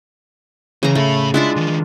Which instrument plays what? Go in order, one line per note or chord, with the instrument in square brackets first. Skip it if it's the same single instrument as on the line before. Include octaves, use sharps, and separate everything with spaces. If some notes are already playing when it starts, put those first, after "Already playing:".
[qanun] C#3 A#5 [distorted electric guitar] E3
[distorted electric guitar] A2 B5 [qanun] A3
[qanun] G#3 D4 F4 [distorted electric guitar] E4
[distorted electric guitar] D#3 E3